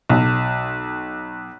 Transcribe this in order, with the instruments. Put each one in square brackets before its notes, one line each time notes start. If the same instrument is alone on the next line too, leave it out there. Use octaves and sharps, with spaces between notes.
[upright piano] B1